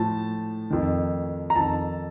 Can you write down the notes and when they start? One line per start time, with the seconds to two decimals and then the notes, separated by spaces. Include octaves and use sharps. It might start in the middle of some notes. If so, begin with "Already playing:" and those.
Already playing: A2 F3 A5
0.70 F2 D#3
1.50 A#5
1.56 F2 D#3 A5